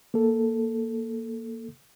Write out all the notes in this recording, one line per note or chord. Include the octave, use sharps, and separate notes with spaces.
A#3 A4